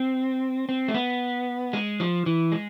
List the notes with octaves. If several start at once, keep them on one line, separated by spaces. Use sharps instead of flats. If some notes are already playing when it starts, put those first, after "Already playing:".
Already playing: C4
C4
A3
B3
G#3
F3
E3
G#3